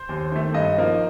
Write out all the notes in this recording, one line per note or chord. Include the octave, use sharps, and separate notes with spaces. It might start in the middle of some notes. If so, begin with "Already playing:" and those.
Already playing: C5
D#2
D#3 A3
G2 D#5
F3 A#3 D#4